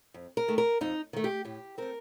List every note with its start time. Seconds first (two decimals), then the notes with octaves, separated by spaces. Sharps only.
0.14 F2
0.37 A#4
0.48 D#3 A3
0.58 A#4
0.81 F2 D#4
1.13 D#3 A3
1.24 G4
1.45 A2 G4
1.78 A3 C4 A#4